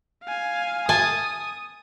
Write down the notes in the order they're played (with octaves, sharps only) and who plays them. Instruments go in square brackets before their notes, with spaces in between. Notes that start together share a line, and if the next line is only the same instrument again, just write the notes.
[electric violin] F5 G#5
[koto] G#5 A5 [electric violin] D#6